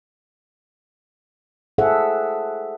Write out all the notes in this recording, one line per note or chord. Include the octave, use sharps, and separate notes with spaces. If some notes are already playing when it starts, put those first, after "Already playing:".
G#4 A4 C5 E5 F#5